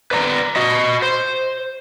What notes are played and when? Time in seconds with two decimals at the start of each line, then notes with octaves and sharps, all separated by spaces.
0.11 B4 D5 A#5
0.56 F#4 D#5
1.02 C5